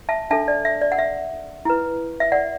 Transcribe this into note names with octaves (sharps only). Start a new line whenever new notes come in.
E5 A5
D4 A4 E5 A5
D5
E5
D5
F#5
E5
E4 B4
E5
D5 F#5